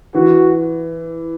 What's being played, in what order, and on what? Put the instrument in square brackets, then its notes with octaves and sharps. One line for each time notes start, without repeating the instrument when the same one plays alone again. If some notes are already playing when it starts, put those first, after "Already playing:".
[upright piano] E3 [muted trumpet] F#4